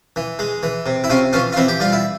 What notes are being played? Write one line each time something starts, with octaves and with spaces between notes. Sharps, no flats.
E3
G#3
E3
C3
E4
C3 C#4 F4
E3 C#4 F4
F4
E3 C4 E4
G4
G3 F4
E4